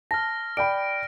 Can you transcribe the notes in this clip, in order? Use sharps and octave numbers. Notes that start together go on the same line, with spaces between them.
A5 F6 A#6
D5 G5 B5 D7